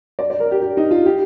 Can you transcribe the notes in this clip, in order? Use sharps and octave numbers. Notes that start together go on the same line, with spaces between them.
D5
D5
A#4
G4
G4
D#4
F4
G4